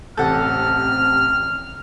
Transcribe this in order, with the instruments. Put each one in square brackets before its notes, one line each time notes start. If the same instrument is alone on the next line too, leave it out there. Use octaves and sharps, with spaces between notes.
[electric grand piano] A1 C3 G6 [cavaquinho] A4 F#5 [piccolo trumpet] F6